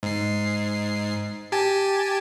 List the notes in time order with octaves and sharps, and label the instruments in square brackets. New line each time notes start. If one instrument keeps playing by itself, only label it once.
[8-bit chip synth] G#2 C7
G4 G#5 A5